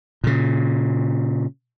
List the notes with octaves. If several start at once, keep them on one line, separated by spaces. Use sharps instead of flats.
A#2 C#3